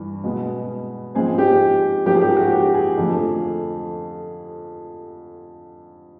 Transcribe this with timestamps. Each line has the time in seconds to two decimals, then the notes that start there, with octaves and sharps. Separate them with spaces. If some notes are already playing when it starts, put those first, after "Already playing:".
Already playing: G2 E3
0.24 B2 G#3 B3
1.15 G#2 F3 G#3 C4 G#4
1.38 G4
2.06 G#2 F3 A#3 G4
2.14 G#4
2.21 G4
2.37 F#4
2.52 G4
2.74 G#4
2.97 F2 D3 F3 A3